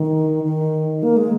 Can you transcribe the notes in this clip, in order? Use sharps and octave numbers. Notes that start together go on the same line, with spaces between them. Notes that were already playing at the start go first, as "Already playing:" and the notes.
Already playing: D#3
D#3
A#3
G#3